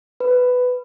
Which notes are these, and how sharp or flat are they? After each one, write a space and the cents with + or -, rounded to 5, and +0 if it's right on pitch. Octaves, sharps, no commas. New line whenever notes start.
B4 +10